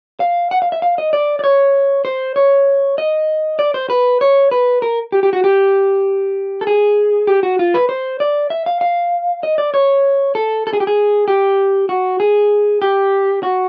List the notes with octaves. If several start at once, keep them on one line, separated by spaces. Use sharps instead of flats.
F5
F#5
F5
E5
F5
D#5
D5
D5
C#5
C5
C#5
D#5
D5
C5
B4
C#5
B4
A#4
G4
G4
F#4
G4
A4
G#4
G4
F#4
F4
B4
C5
D5
E5
F5
F5
D#5
D5
C#5
A4
A4
G#4
G4
G#4
G4
F#4
G#4
G4
F#4